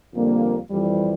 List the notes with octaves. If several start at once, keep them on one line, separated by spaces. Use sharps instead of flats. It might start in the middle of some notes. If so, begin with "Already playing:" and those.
F2 D3 G3 A#3
F2 E3 G3